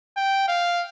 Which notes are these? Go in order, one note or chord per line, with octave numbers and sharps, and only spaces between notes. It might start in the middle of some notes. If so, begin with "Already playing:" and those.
G5
F5